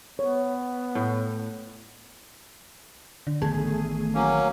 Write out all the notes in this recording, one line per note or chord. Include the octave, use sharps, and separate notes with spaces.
B3 C#5
A2
D3
A1 D#3 A3 B3 G#4
F#3 A#3 C#4